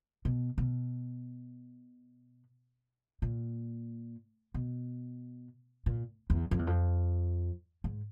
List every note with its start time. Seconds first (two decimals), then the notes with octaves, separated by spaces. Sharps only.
0.25 B2
0.58 B2
3.22 A#2
4.54 B2
5.86 A#2
6.30 E2
6.51 F2
6.59 E2
6.67 F2
7.84 G#2